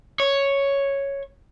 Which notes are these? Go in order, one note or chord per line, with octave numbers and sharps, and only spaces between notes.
C#5